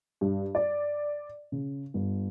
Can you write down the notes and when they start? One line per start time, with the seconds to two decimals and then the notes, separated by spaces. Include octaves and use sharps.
0.21 G2
0.55 D5
1.52 C#3
1.94 G1